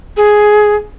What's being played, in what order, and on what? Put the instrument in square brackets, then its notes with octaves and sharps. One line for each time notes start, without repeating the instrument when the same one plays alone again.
[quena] G#4